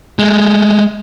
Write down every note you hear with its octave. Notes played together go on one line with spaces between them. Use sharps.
G#3 A3